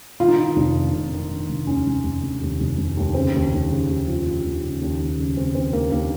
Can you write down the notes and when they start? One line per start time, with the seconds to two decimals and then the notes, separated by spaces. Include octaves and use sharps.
0.20 D#3 F4
0.28 D#4
0.35 D#3 F4
0.56 F1
0.75 D#3
0.93 F1
1.12 D#3
1.31 D#3
1.49 F1
1.67 D#2 C#4
1.86 F1
2.04 F1
2.22 F1
2.41 D#2
2.60 F1
2.77 F1
2.97 D#2
3.14 C#3 C4
3.34 D#2
3.52 D#2
3.71 C#3
3.88 D#2
4.08 F3
4.26 F3
4.44 D#2
4.62 C#3
4.81 D#2
4.99 D#2
5.18 C#3
5.37 C#3 C4
5.55 D#2 C4
5.73 D#2 A#3
5.91 D#2 A#3